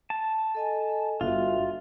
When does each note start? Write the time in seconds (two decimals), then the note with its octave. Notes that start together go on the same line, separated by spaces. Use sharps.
0.10 A5
0.55 A4 D#5 G#5
1.21 G1 D4 F4 F#4 E5